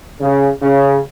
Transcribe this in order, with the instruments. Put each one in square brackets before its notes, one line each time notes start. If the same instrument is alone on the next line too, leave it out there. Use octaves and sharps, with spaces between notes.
[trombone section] C#3
C#3